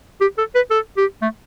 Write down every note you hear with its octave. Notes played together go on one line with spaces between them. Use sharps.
G4
A4
B4
A4
G4
A3